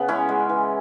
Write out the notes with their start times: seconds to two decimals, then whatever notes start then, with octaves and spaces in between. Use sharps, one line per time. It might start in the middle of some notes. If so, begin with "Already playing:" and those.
Already playing: C#3 B3 B4
0.08 G#3 C#4 E4
0.29 G#3
0.49 E3